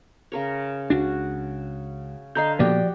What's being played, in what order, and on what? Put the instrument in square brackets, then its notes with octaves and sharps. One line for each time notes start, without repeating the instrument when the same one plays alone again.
[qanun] C#3 A#4 C#5
[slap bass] C#2 D4 [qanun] F#4
[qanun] D3 F5 C6 [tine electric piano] D#5 A#5 G6
[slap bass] A#2 A#3 B3 [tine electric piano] F3 D5 [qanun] F#4 G4 D#5